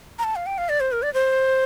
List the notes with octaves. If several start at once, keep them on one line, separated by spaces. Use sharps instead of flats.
A#5
A5
F5
G5
F5
D5
C5
A#4
D5
C5